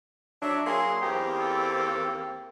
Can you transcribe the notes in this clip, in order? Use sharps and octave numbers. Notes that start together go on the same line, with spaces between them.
F#3 D4 E5
F#3 A#3 G#4 C6
E2 A#3 C4 D#4 G4
A4